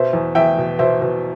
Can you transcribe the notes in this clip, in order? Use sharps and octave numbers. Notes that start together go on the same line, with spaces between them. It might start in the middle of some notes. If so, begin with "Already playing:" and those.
Already playing: B2 C5 E5
E2
E2 E5 G5
B2
B2 C5 E5
B2